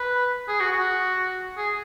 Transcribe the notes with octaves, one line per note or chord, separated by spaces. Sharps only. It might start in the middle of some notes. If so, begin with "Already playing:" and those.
Already playing: B4
G#4
F#4
F#4
G#4